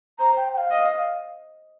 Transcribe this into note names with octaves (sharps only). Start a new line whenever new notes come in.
C5 A#5
G5
G5
F5
D#5